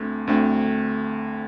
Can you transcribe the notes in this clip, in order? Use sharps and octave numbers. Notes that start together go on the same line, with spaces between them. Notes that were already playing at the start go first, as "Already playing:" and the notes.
Already playing: D2 D3 A3 C4
D2 D3 A3 C4